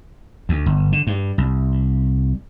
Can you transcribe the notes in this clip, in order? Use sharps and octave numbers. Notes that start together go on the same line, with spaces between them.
D2
G1
D3
G2
C2